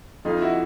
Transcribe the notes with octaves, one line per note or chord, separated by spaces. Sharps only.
F2 D#4 F4
E4 F#4